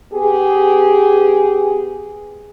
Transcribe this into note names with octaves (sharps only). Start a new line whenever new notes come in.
B3 G4 G#4